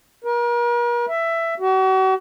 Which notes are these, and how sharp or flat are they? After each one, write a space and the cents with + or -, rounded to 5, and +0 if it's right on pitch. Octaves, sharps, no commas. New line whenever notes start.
A#4 +40
E5 +15
F#4 +40